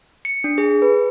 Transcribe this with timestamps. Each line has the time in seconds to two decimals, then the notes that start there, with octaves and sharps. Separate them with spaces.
0.25 C#7
0.44 D4
0.58 G#4
0.82 B4